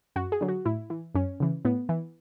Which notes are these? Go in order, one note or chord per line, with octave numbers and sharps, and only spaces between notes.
F#2 F#4
G#4
D3 F#3
F#4
A2 E4
E3
F#2 C#4
C#3 E3
A2 B3
E3